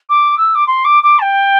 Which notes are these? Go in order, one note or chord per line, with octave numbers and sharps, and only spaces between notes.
D6
E6
D6
C6
D6
D6
A5
G5